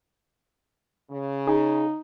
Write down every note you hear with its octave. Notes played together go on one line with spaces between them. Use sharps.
C#3
D#4 G#4